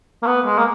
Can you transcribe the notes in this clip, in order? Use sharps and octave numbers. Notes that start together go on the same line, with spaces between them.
A#3
B3
G#3
A#3